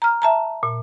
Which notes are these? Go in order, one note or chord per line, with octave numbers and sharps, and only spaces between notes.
A#5 F6
E5 A5 A#5
A#2